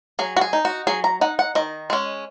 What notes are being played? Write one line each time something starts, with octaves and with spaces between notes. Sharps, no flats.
F#3 G#4
F#4
G#4
D#4
F#4
F#3 G#4
A#5
D#4 F#5
F#5
D#3 D#5
G#3 C#4